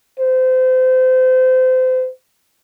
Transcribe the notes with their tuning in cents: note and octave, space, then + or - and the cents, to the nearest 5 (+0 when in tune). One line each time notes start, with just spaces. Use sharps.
C5 -30